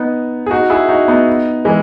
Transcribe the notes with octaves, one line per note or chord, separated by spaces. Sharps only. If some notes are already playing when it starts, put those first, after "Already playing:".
Already playing: B3 D#4
G#4
D#4 F#4
E4 G#4
D#4 F#4
B3 D#4
E3 G#3